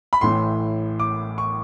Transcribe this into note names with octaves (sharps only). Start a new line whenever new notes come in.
B5
A1 A2 E3 C6
D6
C#6